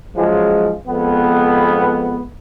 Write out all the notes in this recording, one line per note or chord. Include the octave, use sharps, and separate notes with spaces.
C#2 G#2 F3 F#3 G#3
F2 G#2 B3